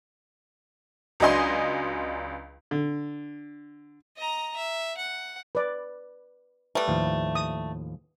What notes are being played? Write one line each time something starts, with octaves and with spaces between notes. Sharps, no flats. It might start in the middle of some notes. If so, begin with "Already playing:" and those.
C#2 F#3 D4 D#5 G#5 C6
D3
D#5 A#5
E5
F#5
B4 D5
G3 A3 B4
D#2 A2 F3
D#6